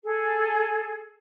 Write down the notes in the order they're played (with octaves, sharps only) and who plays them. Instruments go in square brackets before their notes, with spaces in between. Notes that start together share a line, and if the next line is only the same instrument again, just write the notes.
[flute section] G#4 A4